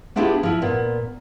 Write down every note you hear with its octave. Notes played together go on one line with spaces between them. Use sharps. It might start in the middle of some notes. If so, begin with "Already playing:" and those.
B3 D4 E4 F4 G4 G#4
F3 E4
A#2 B3